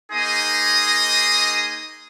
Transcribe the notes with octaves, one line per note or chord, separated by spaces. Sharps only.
A#3 D#4 G#4 D#5 C6 D#6